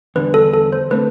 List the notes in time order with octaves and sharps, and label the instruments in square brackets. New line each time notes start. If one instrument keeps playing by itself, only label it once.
[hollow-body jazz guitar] E2 D3 G3 D4 [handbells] B4
[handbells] A4
A4
C5
[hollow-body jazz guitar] D3 A3 C4 [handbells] B4